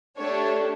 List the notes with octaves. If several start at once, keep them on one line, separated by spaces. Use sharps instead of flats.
A3 D4 G4 C#5